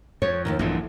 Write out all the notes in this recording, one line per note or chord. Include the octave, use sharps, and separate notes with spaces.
F2 C#5
D#2 A2 D#3
A#1 G2 A#2 D3 E3 D#4